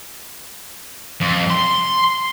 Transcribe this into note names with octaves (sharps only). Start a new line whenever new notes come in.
F2
C6